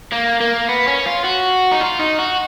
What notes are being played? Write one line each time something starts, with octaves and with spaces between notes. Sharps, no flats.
A#3
A#3
B3
C#4
F4
F#4
D#4
F4
D#4
F#4